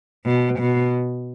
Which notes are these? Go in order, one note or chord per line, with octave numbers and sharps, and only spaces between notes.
B2
B2